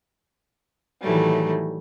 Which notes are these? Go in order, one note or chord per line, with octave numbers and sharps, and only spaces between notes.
A2 D#3 E3 F#3 G3 A3